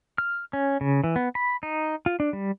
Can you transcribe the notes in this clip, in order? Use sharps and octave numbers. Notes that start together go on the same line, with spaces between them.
F6
C#4
C#3
E3
B3
B5
D#4
F4
D4
G3